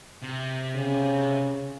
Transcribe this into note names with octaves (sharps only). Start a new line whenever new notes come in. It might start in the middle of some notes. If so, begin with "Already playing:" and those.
C3
C#3